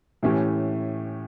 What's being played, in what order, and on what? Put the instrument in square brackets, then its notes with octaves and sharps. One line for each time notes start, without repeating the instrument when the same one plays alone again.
[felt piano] A2 E3 A3 C#4 G4